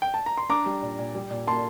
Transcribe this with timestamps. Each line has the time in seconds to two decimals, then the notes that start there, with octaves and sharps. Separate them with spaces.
0.02 G5
0.14 A5
0.26 A#5
0.37 C6
0.49 D4 A#5 D6
0.66 G3
0.82 A#2
0.99 A#2
1.15 G3
1.31 A#2
1.47 A#3 A5 C6